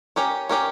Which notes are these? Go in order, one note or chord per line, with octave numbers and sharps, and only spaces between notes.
C#4 G4 A#4 C#5
C#4 G4 A#4 C#5